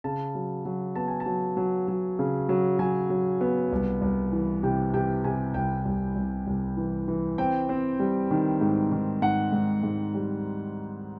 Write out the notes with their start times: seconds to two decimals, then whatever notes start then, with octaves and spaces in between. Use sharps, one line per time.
0.04 C#3 A5
0.35 F#3
0.65 F#3
0.95 B3 A5
1.08 G#5
1.20 A5
1.26 F#3
1.57 F#3
1.88 F#3
2.19 C#3
2.49 F#3
2.79 F#3 G#5
3.10 F#3
3.41 B3
3.72 C2
4.01 C2
4.32 E3
4.63 C3 G5
4.94 C3 G5
5.24 C3 G#5
5.54 C2 G5
5.85 C2
6.16 C2
6.47 C2
6.77 E3
7.08 E3
7.38 C4 G5
7.69 C4
8.00 G3
8.31 D#3
8.61 G#2
8.92 D#3
9.22 G#2 F#5
9.52 G#2
9.83 G#2
10.14 G3